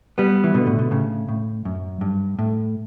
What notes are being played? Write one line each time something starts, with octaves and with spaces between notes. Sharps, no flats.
G3 B3
E3
B2 D3
A2
B2
A2 C#3
A2
F#2
G2
A2